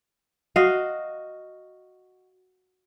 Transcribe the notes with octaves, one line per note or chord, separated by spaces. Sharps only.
F#4 D#5 F5